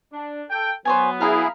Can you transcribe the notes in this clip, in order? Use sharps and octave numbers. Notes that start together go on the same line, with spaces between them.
D4
A4 G5
F#3 B3 C5 C#5 G#5
E4 G#4 F5 A#5 B5